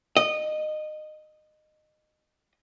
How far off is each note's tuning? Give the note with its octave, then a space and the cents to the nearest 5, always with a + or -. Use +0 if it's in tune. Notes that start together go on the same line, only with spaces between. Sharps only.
D#5 -20